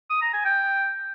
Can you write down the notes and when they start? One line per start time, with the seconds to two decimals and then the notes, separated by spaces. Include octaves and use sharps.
0.10 D#6
0.22 A#5
0.33 G#5
0.45 G5